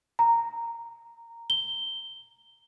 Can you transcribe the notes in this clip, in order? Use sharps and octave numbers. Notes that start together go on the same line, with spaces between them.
A#5
G7